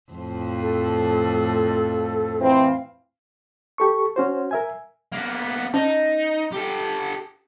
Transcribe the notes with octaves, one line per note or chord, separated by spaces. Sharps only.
F2 A2 F3
A4
E3 C4 F5
G4 A4 C#6
C#4 F#4 C5
A#4 E5 G#5
A#3 B3
C#4 D#4
G4 A4